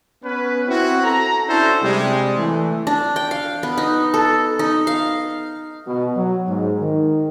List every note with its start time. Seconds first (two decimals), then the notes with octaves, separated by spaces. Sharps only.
0.23 B3 C#4 B4
0.67 C4 E4 F#4
1.04 A4 A#5
1.47 C#4 D4 E4 F#4 A4 C5
1.82 C3 G3 G#3
2.36 E3 A3
2.87 D4
3.16 G5
3.31 F5
3.63 B3
3.78 D#4
4.14 A4
4.59 D#4
4.87 F5
5.86 B2
6.15 F#3
6.48 G#2
6.80 D#3